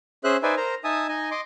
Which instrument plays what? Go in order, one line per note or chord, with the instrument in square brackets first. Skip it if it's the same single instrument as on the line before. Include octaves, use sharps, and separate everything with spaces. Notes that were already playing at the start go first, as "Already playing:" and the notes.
[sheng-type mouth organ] C#4 G#4 C5 E5 F#6
D#4 B4 C5 D5 E5 G#5
A#4 C5 A#5
D#4 E5 G#5 A5 D#6
D#4 D#5 G#5
D#5 C6 D6